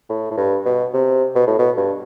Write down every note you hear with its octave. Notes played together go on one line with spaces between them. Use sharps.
A2
A2
G2
B2
C3
B2
A2
B2
G2